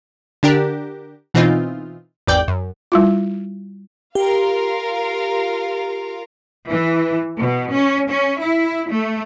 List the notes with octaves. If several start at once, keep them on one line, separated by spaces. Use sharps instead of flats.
D3 D4 G4 A#4
B2 E3 C4 D#4 F4
G#1 E2 D5 G5 G6
F#2
G3 E4 F4
F4 G4 A#4 F5
E3
B2
C#4
C#4
E4
A3